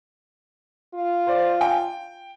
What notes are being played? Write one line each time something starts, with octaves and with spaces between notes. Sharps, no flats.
F4
C5 D5
G5